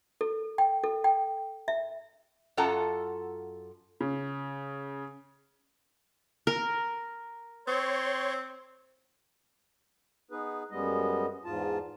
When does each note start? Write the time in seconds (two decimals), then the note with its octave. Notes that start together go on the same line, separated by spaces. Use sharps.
0.21 A4
0.58 G5
0.84 A4
1.04 G5
1.68 E5
2.57 F#2 F4 A4 F#5 A5 A#5
4.01 C#3
6.47 A#4
7.67 C4 C#5 C6 C#6
10.31 B3 D#4 G#4 B4
10.71 F#2 G3 G#3 B3 D#5
11.45 E2 G#2 F4 A5